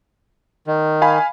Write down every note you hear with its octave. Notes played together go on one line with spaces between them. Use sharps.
D#3
F5 G#5 B5